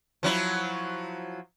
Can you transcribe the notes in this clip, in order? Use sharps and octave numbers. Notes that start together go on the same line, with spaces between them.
F3 F#3 E4